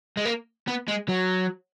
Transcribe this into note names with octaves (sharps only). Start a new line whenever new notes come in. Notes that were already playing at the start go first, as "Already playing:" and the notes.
G#3
A#3
B3
G#3
F#3